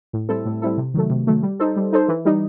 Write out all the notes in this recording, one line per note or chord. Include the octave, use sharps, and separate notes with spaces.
A2
G3 C4 E4 A4
A2
G3 C4 E4 A4
C3
D#3 F#3 A3
C3
D#3 F#3 A3
G3
D#4 A4 C5
G3
D#4 A4 C5
E3
G3 D#4